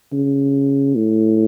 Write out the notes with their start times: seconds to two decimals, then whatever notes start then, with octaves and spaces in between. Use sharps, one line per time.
0.12 C#3
0.95 A2